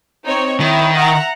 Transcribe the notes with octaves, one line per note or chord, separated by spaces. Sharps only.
C4 D#4 C#5
D#3 E4 C#5
E5 F#5 A#5